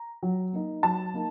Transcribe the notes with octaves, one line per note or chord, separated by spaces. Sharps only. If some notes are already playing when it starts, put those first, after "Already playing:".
Already playing: A#5
F#3
A#3 D#4
F#3 A5
A#3 D#4